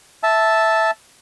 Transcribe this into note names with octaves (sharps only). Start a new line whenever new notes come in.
E5 A5